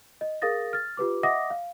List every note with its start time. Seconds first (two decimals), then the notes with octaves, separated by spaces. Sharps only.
0.21 D#5
0.42 G#4 A#4 F5 D#6 A6 A#6
0.73 F6 A6
0.97 F4 G4 B4 D6
1.23 D#5 E5 F#5 D6 D#6 A#6
1.50 F5